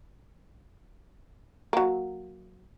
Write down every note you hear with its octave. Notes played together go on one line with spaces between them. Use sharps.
F#3 A#3